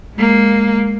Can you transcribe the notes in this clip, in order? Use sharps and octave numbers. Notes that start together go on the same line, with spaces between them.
G#3 A#3